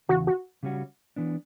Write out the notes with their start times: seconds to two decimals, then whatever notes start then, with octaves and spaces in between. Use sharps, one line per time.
0.09 E2 C#3 E3 F#4
0.27 F#4
0.63 C#3 G3 C#4 F#4
1.16 E3 B3 D4